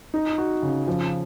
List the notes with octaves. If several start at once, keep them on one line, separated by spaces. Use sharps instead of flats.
D#4
F#4
C#3
F3